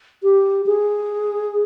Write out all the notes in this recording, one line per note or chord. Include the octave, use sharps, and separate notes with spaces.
G4
G#4